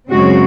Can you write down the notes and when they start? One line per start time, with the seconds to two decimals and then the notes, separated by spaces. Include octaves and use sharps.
0.11 F#2 C#3 G#3 C4 F#4